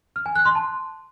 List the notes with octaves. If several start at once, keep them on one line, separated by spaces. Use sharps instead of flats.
F6
G#5
F#6
C6
A5